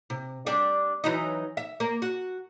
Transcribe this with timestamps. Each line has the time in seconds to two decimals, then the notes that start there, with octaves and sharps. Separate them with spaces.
0.10 C3
0.46 G3 D4 D5
1.04 E3 F#3 D#4
1.57 E5
1.80 A#3
2.02 F#4